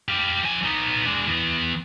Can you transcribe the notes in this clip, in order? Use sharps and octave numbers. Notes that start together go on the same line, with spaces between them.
G4 F5
F3 G#5
B3 D#4
G#3 D4
E3 B3